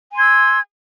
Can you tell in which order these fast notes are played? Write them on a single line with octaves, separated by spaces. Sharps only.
G#5 C6 G#6 E6